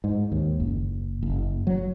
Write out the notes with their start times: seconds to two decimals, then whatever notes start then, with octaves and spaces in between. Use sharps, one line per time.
0.04 G#2
0.32 D#2
0.60 F#1
1.22 F#1
1.67 F#3